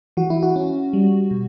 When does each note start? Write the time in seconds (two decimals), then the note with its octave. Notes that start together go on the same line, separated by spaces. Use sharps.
0.17 E3 F#4
0.30 E4
0.43 F#4
0.56 C#4
0.93 G3
1.31 B2